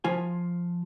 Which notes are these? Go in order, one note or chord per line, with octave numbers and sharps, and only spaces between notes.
F3 F4 G#5